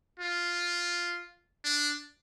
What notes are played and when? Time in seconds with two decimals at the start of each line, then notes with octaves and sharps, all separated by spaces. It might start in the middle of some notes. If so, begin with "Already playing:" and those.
0.20 F4
1.64 D4